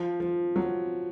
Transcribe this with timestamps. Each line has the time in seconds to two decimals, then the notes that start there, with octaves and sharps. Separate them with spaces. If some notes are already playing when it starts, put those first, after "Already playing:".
Already playing: F3
0.20 F3
0.56 F#3